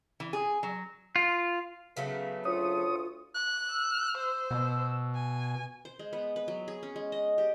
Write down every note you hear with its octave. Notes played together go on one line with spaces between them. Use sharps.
E3
G#4
F#3
F4
C#3 F#3 A3 B3
D2 F4 C#5 D#6
F#6
E6
C5
B2
G#5
C5
G#3
B3
B4
F#3
G#4
C#4
G#3
D#5
G4